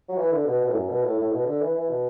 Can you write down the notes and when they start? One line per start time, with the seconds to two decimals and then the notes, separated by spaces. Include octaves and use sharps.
0.09 F#3
0.17 E3
0.32 D3
0.46 B2
0.61 B2
0.68 A2
0.75 F#2
0.89 B2
1.03 A2
1.18 A2
1.32 B2
1.46 D3
1.61 E3
1.75 E3
1.89 B2